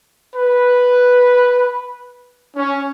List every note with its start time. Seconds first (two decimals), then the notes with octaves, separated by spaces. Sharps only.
0.33 B4
2.56 C#4